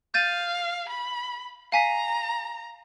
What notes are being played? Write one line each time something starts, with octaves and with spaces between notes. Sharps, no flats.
F5 G6 A6 D#7
B5
F5 G#5 A#5 B6